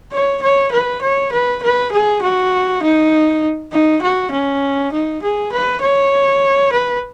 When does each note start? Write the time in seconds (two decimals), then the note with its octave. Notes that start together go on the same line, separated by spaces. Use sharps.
0.13 C#5
0.42 C#5
0.72 B4
1.02 C#5
1.32 B4
1.63 B4
1.92 G#4
2.22 F#4
2.83 D#4
3.72 D#4
4.02 F#4
4.31 C#4
4.92 D#4
5.22 G#4
5.52 B4
5.81 C#5
6.72 B4